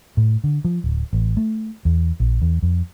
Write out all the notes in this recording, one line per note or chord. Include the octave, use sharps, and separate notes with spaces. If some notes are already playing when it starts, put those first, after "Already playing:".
A2
D3
F3
D1
A1
A3
E2
A#1
E2
F2